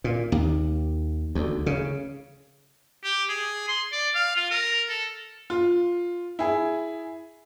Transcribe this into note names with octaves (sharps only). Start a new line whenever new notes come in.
A#2
D#2
D2
C#3
G4
G#4
C6
D5
F5
F4
A#4
A4
F4
E4 G#4